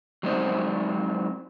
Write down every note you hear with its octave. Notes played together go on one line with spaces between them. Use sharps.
F#3 G#3 C4 D#4 C5 D5